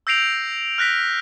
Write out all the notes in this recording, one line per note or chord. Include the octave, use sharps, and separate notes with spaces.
E6 G6 A#6 C7 D7 F7
F6 F#6 A#6 B6